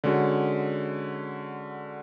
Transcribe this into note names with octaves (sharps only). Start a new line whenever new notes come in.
D3 G#3 C#4 F#4